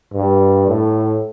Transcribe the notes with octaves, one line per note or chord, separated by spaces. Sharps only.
G2
A2